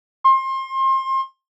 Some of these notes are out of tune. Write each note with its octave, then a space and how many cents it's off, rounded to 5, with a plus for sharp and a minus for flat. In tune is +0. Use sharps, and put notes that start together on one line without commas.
C6 +30